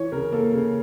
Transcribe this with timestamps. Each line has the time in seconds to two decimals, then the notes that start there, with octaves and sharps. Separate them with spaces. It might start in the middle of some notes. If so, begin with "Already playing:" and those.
Already playing: E3 C#5
0.12 C#3 A#4
0.32 A#3 A4
0.52 C#3